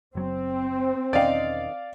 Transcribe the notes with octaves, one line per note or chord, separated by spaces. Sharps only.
F#1 F#3 C4
E1 D#3 C#4 D5 D#5 F5